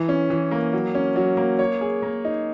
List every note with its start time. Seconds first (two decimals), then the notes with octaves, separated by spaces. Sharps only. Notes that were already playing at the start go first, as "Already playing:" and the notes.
Already playing: E3
0.09 C#4
0.30 E3
0.51 A#3
0.73 F#3
0.95 C#4
1.16 F#3
1.37 A#3
1.59 C#5
1.81 G#4
2.02 A#3
2.25 D#4